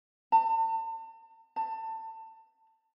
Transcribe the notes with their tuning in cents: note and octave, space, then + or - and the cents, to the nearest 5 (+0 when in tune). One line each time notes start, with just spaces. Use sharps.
A5 +40
A5 +25